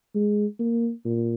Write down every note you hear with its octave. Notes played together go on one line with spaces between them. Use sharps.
G#3
A#3
A#2